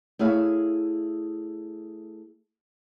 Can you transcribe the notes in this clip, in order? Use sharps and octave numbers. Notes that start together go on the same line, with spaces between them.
A3 E4 G#4 C#5 E5 F5